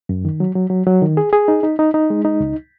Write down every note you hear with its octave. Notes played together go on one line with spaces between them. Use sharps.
F#2
D#3
F#3
F#3
F#3
F#3
D#3
G#4
G#4
D#4
D#4
D#4
D#4
G#3
D#4
C#2